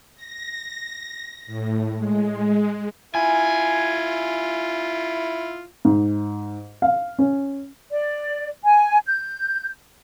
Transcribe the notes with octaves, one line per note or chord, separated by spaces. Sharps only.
A#6
A2
G#3
E4 F4 G#5
G#2
F5
C#4
D5
G#5
G6